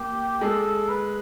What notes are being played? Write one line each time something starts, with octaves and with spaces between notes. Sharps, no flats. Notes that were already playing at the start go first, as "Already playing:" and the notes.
Already playing: A#3 G4
G#3 A4
B4